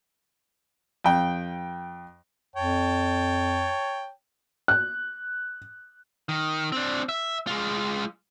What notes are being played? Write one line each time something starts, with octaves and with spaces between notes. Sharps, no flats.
F2 G5
F2 C#5 G5 A5
F#6
D#3
C4 D4
E5
G#3 F4